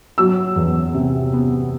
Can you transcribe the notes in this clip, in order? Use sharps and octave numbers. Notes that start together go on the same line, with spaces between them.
F#3 E6
E2
C3
B3